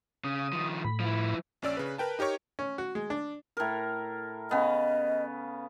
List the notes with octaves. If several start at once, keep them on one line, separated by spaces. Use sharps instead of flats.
C#3 D#6
D#3 F3
A2 B5
F3 E4
A#1 C#4 D5 E6
C#3 B4
A#4 B4 G5 A5
D#4 G4 A#4 C#5 C#6
C#4
F#4
G#3
D4
A2 A#4
C#3 B3 D#5